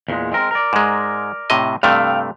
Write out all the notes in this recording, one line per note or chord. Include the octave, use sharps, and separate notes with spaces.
E2 A#2 G#3
G#3 C4 A#4
A#4 D5
G#2 G#3
A2 C3 D#5
G2 C3 A3 F5 G5